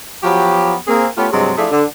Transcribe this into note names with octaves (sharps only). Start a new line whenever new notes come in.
F3 F#3 B3 F#4 G4
A#3 C4 G#4
A3 B3 C#4 F4 G4
G2 C3 F#3 G#3
F3 A3 D4 E4 F4 G#4
D3